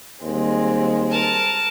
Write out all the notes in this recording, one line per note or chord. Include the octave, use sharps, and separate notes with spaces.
D#2 G3 G#3 C4
A#4 A5